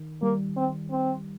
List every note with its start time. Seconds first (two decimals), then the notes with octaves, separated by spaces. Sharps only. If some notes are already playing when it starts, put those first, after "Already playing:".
Already playing: D#3
0.22 G3 A#3
0.57 C4
0.91 C4